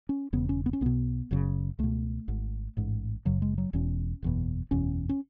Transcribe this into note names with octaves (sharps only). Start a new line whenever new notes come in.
C#4
E1 E2 C#3 B3
C#4
B3
C#4
B1 B2 B3
F#1 F#2 C#3
C#2 B2 A3
G#1 G#2
A1 G#2
F#1 F#2 C#3 F#3
G#3
F#3
E1 E2 B2 C#4
F#1 E2 B2
F#1 E2 B2 C#4
C#4